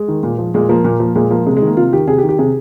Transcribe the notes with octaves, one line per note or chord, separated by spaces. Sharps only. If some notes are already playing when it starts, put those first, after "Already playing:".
Already playing: G#3
D#3
A#2
F3
A#2 G#3
F3 A#3
A#2
F3
A#2 G#3
F3 A#3
C3 G#3
G#3
D#3
A#3
C3 F4
D#3 G4
C3 G#4
G4
D#3
G4
C3 G#4